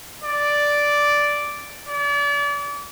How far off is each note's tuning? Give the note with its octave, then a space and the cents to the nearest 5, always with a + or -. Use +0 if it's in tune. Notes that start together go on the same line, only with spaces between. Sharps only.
D5 -5
D5 -35